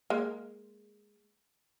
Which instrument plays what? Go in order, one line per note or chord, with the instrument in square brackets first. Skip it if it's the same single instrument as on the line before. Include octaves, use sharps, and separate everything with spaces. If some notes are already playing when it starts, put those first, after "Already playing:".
[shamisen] G#3 A#3